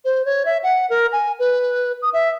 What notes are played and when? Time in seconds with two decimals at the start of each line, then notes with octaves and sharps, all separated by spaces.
0.05 C5
0.25 C#5
0.45 E5
0.63 F#5
0.90 A#4
1.12 G#5
1.39 B4
2.02 D#6
2.13 E5